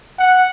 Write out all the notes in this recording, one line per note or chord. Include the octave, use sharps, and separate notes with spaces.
F#5